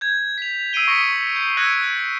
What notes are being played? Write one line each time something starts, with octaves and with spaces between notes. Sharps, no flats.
G6 G#6
B6 F7
E6 C7 D7 D#7 G7
C#6 D#6 A#6 B6 C#7
G6 C7
E6 F#6 G#6 A#6 C#7 D7